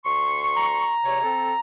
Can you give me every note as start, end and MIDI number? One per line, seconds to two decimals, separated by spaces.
0.04 0.92 38
0.04 0.92 84
0.04 0.92 85
0.56 1.60 82
1.04 1.22 40
1.04 1.22 48
1.04 1.22 73
1.23 1.52 60
1.23 1.52 69